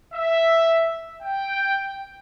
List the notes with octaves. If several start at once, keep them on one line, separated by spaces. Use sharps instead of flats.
E5
G5